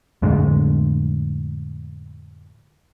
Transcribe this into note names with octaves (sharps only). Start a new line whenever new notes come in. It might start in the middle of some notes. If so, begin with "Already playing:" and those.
F2 A2 D3 G#3